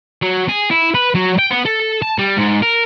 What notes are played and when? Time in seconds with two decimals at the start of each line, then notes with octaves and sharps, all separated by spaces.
0.22 F#3
0.49 G#4
0.71 E4
0.95 B4
1.15 F#3
1.38 G5
1.50 B3
1.65 A4
2.02 A5
2.18 G3
2.37 G#2
2.63 A#4